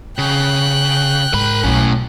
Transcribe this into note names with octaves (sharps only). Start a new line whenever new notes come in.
C#3 G5 F#6
G#2 A#4 B5
B1 A2 C#4